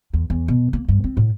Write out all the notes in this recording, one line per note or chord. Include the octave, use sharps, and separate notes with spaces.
E2
E2
B2
A#3
G2
C4
A2